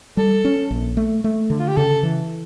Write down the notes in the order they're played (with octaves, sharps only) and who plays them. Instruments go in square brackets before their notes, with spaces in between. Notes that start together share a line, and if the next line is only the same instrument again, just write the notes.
[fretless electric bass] G3 [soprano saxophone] A4
[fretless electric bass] C#4
A#1
A3
A3
D3
[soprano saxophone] F4
G4
[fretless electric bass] C#3 [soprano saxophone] A4
[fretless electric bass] E3